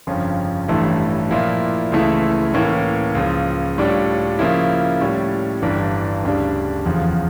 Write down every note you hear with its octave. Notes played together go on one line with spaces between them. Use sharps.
G1 F2 C#3 F3 C#4
A1 G2 E3 A3 E4
A#2 F3 A#3 E4
C#2 C#3 E3 A3 E4
A2 E3 A#3 C#4
C#2 C#3 F3
A2 G3 D4 F4 C#5
C#3 F3 A#3 C#4 E4
A2 G3 C#4
G1 G2 E3 G3 D4
D2 C#3 G3 D4
F1 E2 C#3 F3